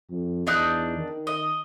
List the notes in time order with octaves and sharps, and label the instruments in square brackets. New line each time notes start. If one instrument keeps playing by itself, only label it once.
[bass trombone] F2
[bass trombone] E2 [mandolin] D4 D#4 F#6
[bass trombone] D#3
[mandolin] D#5